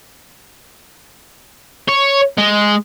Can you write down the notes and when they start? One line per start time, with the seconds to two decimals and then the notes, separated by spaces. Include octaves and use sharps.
1.88 C#5
2.38 G#3